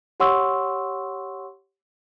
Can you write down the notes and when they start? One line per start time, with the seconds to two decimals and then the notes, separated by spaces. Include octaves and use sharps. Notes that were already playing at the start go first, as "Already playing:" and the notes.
0.20 G4 C#5 F#5 C6 C#6 E6